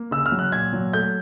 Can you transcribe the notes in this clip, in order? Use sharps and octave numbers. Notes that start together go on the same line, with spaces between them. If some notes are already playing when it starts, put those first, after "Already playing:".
Already playing: A#3
C#3 E6
F6
F#3
F#6
A#2 G#6
F#3
A3 G6